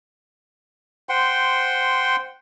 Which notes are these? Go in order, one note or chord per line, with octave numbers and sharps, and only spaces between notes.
C5 F#5 G5 C6